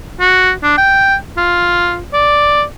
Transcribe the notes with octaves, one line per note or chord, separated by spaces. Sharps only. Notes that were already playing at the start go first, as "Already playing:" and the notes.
F#4
D4
G5
F4
D5